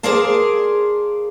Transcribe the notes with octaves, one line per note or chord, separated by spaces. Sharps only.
G#4 A#4 C5 D5 F5 A5